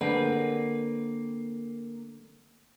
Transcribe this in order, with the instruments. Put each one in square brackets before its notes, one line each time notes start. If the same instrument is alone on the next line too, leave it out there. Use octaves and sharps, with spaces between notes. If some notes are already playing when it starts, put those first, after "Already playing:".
[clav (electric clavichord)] D3 [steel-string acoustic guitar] A#3 [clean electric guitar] C4 G#4 B4